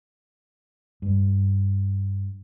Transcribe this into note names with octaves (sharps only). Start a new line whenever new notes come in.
G2